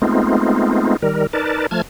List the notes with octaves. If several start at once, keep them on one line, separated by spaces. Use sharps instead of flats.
G#3 A3 B3 C4 D#4 F4
D#3 G3 A#4
D#4 A#4 B4 D5 A5
F3 A3 A5 F6 G#6